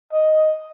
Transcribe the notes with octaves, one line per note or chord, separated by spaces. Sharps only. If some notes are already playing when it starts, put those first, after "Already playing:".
D#5